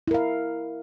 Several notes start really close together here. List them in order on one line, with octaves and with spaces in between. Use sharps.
E4 A#4 F5